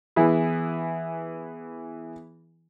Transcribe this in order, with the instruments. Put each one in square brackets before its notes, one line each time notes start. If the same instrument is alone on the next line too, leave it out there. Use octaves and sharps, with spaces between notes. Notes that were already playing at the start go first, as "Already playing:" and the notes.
[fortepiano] E3 B3 E4 G#4